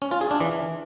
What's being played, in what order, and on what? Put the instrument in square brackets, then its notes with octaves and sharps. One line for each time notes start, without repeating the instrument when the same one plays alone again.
[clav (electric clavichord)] C#4
F4
G#4
D4
E3